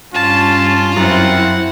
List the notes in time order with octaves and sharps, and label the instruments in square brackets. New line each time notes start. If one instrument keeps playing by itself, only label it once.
[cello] G2 C#4 [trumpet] F4 [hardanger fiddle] A5
[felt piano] F#2 [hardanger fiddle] C4 F#5 [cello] E4